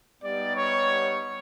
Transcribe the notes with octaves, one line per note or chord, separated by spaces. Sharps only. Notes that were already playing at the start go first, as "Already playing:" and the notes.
G3 B3 D#4 G4 D5
C#5